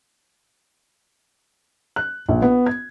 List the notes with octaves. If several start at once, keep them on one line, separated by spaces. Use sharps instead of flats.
F#6
A#1
B3
G#6